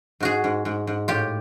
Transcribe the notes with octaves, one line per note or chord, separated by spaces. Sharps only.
G#2 F#4 G#4
G#2
G#2
G#2
A2 F4 G4